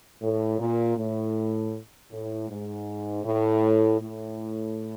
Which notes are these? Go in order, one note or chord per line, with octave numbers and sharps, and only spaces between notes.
A2
A#2
A2
A2
G#2
A2
A2